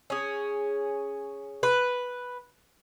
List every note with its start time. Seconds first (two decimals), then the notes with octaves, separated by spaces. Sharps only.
0.10 C#4 G#4
1.63 B4